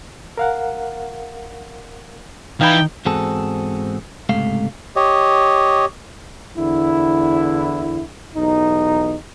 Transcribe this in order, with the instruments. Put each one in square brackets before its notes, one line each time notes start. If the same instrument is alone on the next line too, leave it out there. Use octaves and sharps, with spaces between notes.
[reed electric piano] A#4 F5 F#5
[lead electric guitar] E3 E4 [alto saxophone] D#4 [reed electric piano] F5 B5 [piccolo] G5
[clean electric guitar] E2 G#2 C4 F#4 G#4 A4
C#2 G#2 C3 A3 F5
[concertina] G4 C#5 D#5
[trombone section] E2 D3 E4
B1 E2 D#4